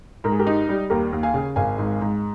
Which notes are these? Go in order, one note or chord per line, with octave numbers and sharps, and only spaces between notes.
G#2 A#4
G#4
G4 A#4
D#4
G3
D#2 G4 A#4
D#2
F5 G#5
C#3
G#1 F5 G#5
G#2
G#2